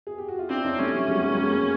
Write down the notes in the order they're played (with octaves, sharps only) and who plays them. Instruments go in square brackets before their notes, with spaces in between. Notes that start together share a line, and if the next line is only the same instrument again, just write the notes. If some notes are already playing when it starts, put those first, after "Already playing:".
[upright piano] G#4
G4
F#4
F4
[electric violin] C4 [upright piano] D4 E4
[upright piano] C#4 D#4
[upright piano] G3 A3 [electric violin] C#4
[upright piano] G3 A3
F#3 G#3
B3
G#3 A#3
G#3 A#3
G#3 A#3